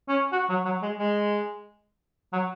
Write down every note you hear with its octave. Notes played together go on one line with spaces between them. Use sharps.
C#4
F#4
F#3
F#3
G#3
G#3
F#3